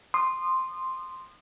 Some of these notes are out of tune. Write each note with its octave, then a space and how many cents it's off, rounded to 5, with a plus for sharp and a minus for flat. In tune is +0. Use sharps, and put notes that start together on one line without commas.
C6 +0 D#6 -30